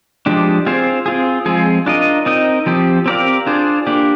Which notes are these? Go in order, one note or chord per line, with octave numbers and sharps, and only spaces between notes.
F3 G#3 D4 G4
C4 F4 G#4 C5
C4 F4 G#4
F3 G#3 C4 F4 G#4
D4 F4 A#4 D#5
C4 D#4 A#4 D#5
F3 C4 G4
C4 G4 A#4 D5 F5
D4 F4 G#4 C5
A#3 D4 G4